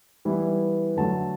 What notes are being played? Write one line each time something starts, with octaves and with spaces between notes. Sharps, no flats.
E3 G3 B3 E4
D3 F#3 A3 A5